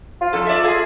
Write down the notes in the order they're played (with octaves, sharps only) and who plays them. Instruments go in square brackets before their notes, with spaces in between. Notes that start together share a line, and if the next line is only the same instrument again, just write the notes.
[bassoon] F4
[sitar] F2 A4
D5 E5
[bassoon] F4 [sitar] G#4